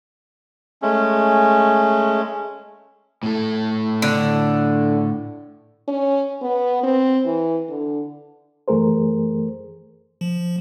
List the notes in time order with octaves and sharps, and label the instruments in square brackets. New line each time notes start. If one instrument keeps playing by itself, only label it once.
[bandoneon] G#3 A3 C#4
[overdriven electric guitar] A2 A4
[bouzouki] D3
[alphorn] C#4
B3
C4
E3
D3
[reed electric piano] F#2 E3 A3 G#4 A#4 C5
[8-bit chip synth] F3